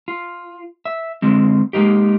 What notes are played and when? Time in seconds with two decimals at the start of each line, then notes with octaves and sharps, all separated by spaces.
0.08 F4
0.85 E5
1.22 D3 G#3 C4
1.73 G#3 A#3 D#4 G4